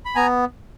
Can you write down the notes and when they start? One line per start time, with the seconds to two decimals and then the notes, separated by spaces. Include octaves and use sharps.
0.05 B5
0.15 B3 G#5 A#5